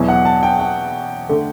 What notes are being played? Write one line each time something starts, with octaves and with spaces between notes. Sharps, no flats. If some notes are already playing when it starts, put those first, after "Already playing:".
Already playing: E2 B2 F#3 B3 E4
F#5
A5
G5
F#5
D3 A3